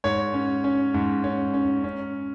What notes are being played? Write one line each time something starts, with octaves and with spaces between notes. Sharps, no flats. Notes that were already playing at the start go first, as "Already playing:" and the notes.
G#2 C#5
C#4
C#4
G#2
C#4
C#4
C#4